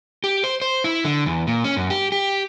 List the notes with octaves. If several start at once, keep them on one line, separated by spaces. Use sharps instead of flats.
G4
C5
C5
E4
D3
E2
A#2
C#4
F#2
G4
G4